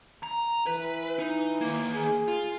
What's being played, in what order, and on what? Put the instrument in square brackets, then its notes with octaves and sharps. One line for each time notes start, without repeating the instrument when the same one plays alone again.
[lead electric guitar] A#5
[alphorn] E3 [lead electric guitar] B4
[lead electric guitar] D#4
D#2 A#3
[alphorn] G#4
[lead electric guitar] F4